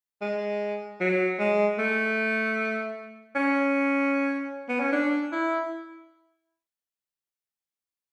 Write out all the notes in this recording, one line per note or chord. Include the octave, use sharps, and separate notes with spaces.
G#3
F#3
G#3
A3
C#4
B3
C#4
D4
E4